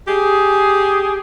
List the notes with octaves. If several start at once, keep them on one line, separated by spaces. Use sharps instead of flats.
G4 G#4